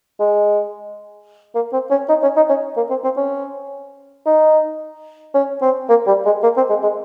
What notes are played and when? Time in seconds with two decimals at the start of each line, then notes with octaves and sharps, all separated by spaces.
0.20 G#3
1.55 A#3
1.73 C4
1.91 C#4
2.09 D#4
2.23 C#4
2.36 D#4
2.49 C#4
2.77 A#3
2.90 C4
3.04 C4
3.17 C#4
4.26 D#4
5.34 C#4
5.62 C4
5.89 A#3
6.07 G3
6.25 G#3
6.43 A#3
6.57 C4
6.69 G#3
6.83 G#3